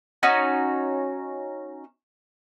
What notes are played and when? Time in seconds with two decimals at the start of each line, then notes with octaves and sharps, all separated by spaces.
0.23 C#4 D#4 F#4